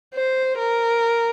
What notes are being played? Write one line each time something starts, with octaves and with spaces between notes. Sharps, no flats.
C5
A#4